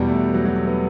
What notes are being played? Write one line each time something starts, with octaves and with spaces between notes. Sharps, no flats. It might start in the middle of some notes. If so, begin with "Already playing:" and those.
Already playing: E2 B2 G3
A3
F#3
F#3
A3
B3